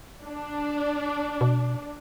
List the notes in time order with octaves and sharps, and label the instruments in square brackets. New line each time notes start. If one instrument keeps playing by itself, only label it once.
[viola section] D4
[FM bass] B2